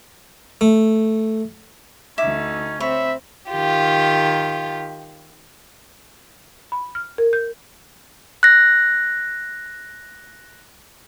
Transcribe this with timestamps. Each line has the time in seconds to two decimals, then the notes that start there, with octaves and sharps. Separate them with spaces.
0.61 A3
2.18 D2 C#4 D#4 E5 D6
2.80 C4 C#5 E5 B5
3.50 D#3 F4 G4
6.72 B5
6.95 F6
7.18 A#4
7.33 G6
8.43 F#6 A#6